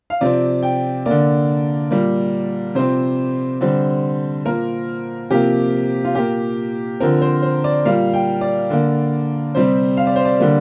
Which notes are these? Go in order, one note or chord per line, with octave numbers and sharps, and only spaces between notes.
F5
C3 F3 C4 D5
G5
D3 A#3 D5
A#2 G3 A#3
C3 F3 C4 C5
D3 G3 C4
A#2 A#3 A#4
C3 F3 A#3 G4
F4
A#2 A#3 G4
D3 F3 C4 A#4
C5
C5
D5
A#2 G3 A#3 F5
G5
D5
D3 A#3
C3 G3 C4 C5
F5
D5
C5
D5
D3 G3 A#3